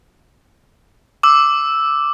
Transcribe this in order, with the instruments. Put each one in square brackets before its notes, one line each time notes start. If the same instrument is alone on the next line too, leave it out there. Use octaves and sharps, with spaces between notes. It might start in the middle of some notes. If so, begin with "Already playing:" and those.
[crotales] D6 E6